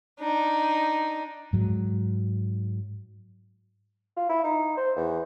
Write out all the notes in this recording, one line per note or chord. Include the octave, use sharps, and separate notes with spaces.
D4 D#4
G#2 F#3
F4
E4
D#4
C5
E2